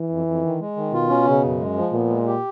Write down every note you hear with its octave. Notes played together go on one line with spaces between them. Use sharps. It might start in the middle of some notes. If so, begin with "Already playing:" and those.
Already playing: E3
F2
F2
D#3
G#3
D#3
B2 F4
C#4
C#3
F#2
G#3
F3
A#2 B3
G#3
G4